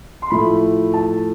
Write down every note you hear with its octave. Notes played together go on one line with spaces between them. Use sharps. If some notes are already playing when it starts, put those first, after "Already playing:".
C6
A2 F3 A3 B5
A5